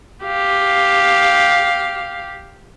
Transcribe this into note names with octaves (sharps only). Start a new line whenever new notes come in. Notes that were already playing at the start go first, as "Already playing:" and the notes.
G4 F5